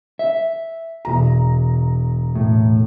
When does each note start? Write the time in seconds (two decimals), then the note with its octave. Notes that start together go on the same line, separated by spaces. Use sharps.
0.19 E5
1.05 E1 A#5
2.35 A2